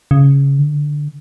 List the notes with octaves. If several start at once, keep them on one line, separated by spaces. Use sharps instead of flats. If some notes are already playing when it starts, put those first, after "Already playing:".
C#3
D3